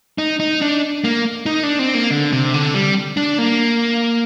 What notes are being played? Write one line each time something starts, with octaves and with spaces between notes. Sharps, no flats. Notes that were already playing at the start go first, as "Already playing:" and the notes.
D#4
D#4
D4
A#3
D#4
D4
C4
A#3
D3
C3
D3
G3
D4
A#3